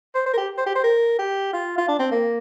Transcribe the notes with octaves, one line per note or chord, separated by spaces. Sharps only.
C5
C5
A#4
G4
C5
G4
C5
A#4
G4
F4
F4
D4
C4
A#3